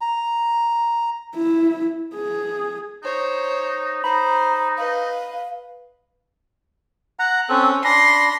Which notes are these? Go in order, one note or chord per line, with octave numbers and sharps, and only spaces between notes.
A#5
E4
G#4
D#4 C5 C#5
D#4 C5 A#5 B5
B4 D#5 F5
F#5 A#5 F#6
C4 C#4 A4
D4 B5 C6 A#6